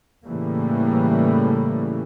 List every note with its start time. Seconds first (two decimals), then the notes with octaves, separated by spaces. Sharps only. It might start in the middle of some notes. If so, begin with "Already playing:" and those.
0.25 A2 C#3 E3 G3 A3 A#3